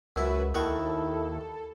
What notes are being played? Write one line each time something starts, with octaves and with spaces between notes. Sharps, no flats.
C#2 F#2 E4 F#4 B4 E5
D#2 D#3 E4 F#4 A4 C#6